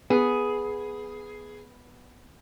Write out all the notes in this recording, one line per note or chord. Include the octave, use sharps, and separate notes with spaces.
B3 G#4